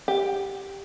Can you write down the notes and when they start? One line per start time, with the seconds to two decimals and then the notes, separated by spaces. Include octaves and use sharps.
0.08 G4